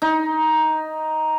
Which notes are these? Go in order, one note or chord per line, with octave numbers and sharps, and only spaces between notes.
D#4